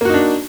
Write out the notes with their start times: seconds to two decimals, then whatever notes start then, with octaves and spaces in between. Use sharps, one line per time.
0.01 A#3
0.05 F#4
0.10 D#4
0.14 D4